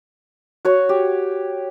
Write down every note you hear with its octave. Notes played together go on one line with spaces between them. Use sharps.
F#4 C#5
G4